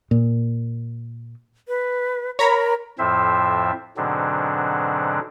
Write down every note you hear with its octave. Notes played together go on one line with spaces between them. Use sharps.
A#2
B4
A#4 C#5 A#5 B5
F2 A2 F3 C4 C5 E5
G#2 B2 D3 F#3 C4 D4